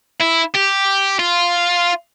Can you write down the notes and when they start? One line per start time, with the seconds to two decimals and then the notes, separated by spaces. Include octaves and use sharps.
0.21 E4
0.55 G4
1.19 F4